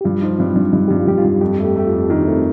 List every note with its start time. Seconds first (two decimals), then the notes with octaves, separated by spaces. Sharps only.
0.01 G4
0.04 G2 F4
0.21 F3 D#4
0.39 G2 C4
0.56 G2 D4
0.73 G2 D#4
0.88 G2 G4
0.96 F4
1.07 G2 G4
1.18 F4
1.24 G2
1.41 F2 G4
1.59 A3
1.65 G4
1.76 A3 G4
1.86 F4
1.92 F2
2.09 D#3 D4
2.26 A3 C4